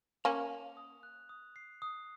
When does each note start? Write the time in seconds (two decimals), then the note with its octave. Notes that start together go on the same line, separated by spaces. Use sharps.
0.24 A#3 C#4 F7
0.50 F7
0.77 D#6
1.03 F#6
1.29 D#6
1.56 C7
1.82 D#6